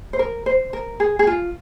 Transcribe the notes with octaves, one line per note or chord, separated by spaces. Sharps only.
C5
A#4
C5
A#4
G#4
G#4
F4